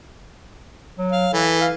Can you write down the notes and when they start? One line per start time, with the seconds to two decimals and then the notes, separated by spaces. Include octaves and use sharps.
0.98 F#3
1.12 F5
1.33 E3 A4
1.61 F5